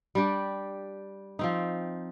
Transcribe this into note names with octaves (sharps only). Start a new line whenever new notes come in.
G3 D4 G4
F3 C4 D#4